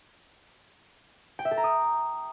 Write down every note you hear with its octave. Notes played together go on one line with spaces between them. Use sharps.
G5
E5
A4
A#5
D#6